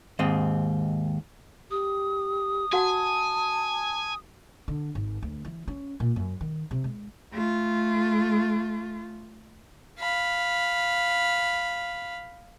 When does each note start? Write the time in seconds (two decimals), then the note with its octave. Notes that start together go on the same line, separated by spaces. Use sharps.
0.19 D#2 G#2 C4 D#5
1.71 G4 D#6
2.73 F#4 F#5 G#5 A5
4.68 D3
4.95 G#1
5.23 D2
5.45 E3
5.68 C#4
6.00 A#2
6.16 F#2
6.41 D#3
6.71 C3
6.84 G#3
7.32 A3 F4
10.00 F5 B5